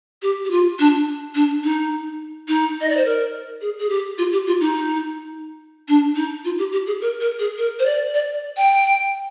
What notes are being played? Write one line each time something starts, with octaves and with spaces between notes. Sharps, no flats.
G4
G4
F4
D4
D4
D#4
D#4
D#5
D5
C5
A#4
G#4
G#4
G4
F4
G4
F4
D#4
D4
D#4
F4
G4
G4
G#4
A#4
A#4
G#4
A#4
C5
D5
D5
G5